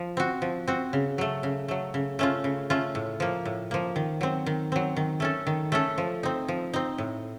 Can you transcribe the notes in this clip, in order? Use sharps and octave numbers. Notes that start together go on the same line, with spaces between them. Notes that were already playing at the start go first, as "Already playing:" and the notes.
Already playing: F3
C4 F#4
F3
C4 F#4
C#3
F#3 A3
C#3
F#3 A3
C#3
A3 C#4 F4
C#3
A3 C#4 F4
A2
F3 A#3
A2
F3 A#3
D#3
F#3 C4
D#3
F#3 C4
D#3
A3 C#4 A4
D#3
A3 C#4 A4
F3
C4 D#4
F3
C4 D#4
A2